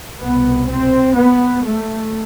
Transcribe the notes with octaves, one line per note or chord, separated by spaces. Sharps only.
C2 B2 B3
C4
B3
A3